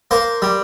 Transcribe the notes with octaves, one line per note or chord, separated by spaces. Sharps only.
A#3 C5
G3